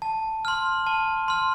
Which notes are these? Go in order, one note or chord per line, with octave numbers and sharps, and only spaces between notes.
A5
C6 F6
A5
C6 F6